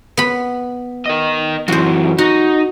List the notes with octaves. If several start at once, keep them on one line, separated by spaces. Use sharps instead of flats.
B3 B5
A#4 D#5
F#2 E3 F#4 C5
D#4 F#4